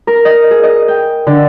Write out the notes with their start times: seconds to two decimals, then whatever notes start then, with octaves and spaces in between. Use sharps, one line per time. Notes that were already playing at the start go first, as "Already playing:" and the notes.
0.07 A#4
0.25 D#5
0.51 G#4
0.63 D#5
0.88 G5
1.27 D3